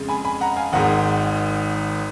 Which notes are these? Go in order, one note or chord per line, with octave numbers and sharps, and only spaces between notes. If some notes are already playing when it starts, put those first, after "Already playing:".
Already playing: F2 C#3 G#3
G#5 B5
G#5 B5
F#5 A#5
F5 G#5
G#1 G#2 D#3 G#3 F#5 A#5